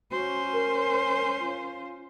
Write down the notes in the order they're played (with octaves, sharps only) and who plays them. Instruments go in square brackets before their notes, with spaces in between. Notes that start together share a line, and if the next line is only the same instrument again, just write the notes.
[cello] C#4 C5 [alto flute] F#4
[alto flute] A#4
F4